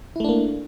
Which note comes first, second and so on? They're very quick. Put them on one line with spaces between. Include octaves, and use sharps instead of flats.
E4 A3 D4 A#3